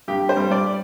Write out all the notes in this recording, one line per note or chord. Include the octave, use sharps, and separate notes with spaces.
G2 G4
C5
G3
D5